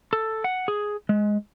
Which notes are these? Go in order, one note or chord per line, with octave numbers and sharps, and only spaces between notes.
A4
F#5
G#4
G#3